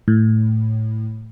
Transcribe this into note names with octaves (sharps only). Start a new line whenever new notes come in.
A2